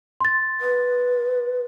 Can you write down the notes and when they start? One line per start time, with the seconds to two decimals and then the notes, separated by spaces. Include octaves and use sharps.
0.20 C6 A6
0.61 B4